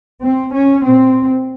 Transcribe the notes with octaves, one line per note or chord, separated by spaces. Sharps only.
C4
C#4
A#2 C4